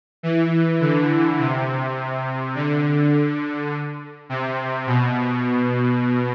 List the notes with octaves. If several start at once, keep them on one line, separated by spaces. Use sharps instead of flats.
E3
D3
C3
D3
C3
B2